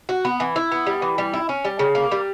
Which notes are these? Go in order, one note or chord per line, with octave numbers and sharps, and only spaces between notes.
F#4
B3
E3
E4
B3
G3
E3
G3
E4
C#4
G3
C#3
A#3
G3